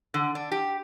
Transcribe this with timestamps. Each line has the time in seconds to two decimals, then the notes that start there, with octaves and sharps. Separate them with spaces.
0.14 D3
0.35 D4
0.52 G4